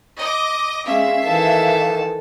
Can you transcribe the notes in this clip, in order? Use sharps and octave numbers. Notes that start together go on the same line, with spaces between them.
D#5 D6
G#3 C#4 E5 F5
D#3 E3 A4 A5